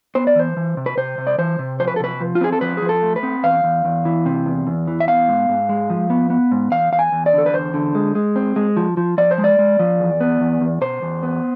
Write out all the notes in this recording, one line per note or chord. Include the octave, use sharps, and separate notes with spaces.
B3 C5
D5
E3 C5
E3
C3
B4
C3 C5
C3
D5
E3 C5
C3
F3 C5
B4
A4
C3 B4
F3
F4
C4 G#4
A4
F3 B4
F3 G#4
A4
A3
B4
C4
E2 F5
E2
E2
E3
C3
E2
E2
E3
E5
B3 F5
G#2
G#2
G#3
F3
B3
B3
G#2
E2 F5
E2 F5
G#5
E2
D5
D3
A4
B4
E2 C5
D3
G#3
G#3
C4
G#3
F3
F3
F3 D5
C5
G#3
D5
G#3
F3
E2
B3
E2
E2
B2 C5
E2
B3